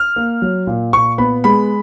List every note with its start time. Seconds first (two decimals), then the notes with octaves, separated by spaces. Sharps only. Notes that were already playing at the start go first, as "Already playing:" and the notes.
Already playing: F6
0.16 A#3
0.42 F#3
0.67 A#2
0.93 A#2 C#6
1.18 B3 B5
1.44 G#3 B5